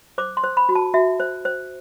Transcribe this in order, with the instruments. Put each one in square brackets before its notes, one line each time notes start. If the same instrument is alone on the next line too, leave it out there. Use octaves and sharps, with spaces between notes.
[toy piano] C5 D6
C6
C5
B5
F#4
A5
F#4 E5
C5
C5